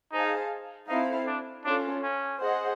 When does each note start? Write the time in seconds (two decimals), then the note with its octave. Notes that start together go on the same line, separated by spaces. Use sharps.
0.12 D#4 G#4 C5 F5 A5
0.88 C4 D#4 E4 A4 C5 F5
1.27 D4
1.65 C#4 D4 F4 A4
2.03 C#4
2.41 G#4 C5 D#5 F#5